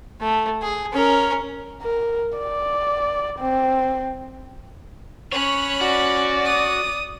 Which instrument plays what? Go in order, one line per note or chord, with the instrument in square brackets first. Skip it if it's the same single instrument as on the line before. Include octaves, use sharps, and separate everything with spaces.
[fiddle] A3
G#4
C#4 A#4
[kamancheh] A#4
D5
C4
[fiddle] C#4 [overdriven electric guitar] C#5 [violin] B5 F#6
[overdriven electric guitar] F#4 [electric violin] D5
[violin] D#6